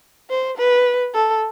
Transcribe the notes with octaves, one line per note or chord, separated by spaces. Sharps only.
C5
B4
A4